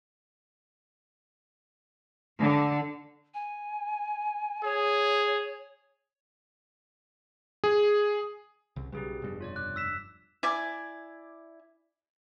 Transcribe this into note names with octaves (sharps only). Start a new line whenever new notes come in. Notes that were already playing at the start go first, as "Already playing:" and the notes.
D3
G#5
G#4 C#5
G#4
C2 C#3
B1 C#3 F#3 G3 G4 G#4 B4
F1 G2 B2 G3
F4 C#5 D5
D6 F#6
E6 B6 E7
E4 D5 G#5